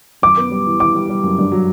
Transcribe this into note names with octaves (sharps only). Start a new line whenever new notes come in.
F#2 D6
B3
G3
E3
E3 D6
G3
G3
F#2
G2
F#3